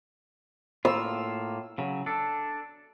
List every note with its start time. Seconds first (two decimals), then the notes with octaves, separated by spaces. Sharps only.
0.85 A2 A#3 F4 E6
1.78 C#3 F#3
2.06 D4 A4